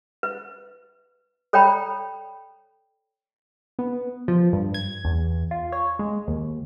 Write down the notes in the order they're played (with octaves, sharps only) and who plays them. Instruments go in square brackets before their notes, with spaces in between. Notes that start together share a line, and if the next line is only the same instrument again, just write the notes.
[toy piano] B4
A4 C#5 D5 G5 A#5 B5
[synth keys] B3
F3
G2
G#6
E2
F4
C#5
G#3
D#2